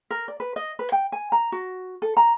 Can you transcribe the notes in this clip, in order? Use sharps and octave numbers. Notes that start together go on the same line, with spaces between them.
A#4
D5
B4
D#5
B4
G5
G#5
A#5
F#4
A4
A#5